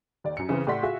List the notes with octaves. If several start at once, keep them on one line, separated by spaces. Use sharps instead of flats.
D#2 D5
F#2 C#7
C#3 E3 C4
A2 G4 D5 F#5 C6 B6
F4 F#4 G#4 E5